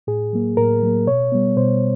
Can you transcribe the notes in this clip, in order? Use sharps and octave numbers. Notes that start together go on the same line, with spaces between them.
A2 G#4
F#3 A#3
A2 A#4
F#3 A#3
B2 C#5
G3 B3
B2 C5